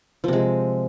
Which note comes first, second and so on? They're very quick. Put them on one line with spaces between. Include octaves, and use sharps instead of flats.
F3 C3 G#3